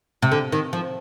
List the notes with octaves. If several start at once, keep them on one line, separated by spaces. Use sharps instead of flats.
C3
D3
D#3
F3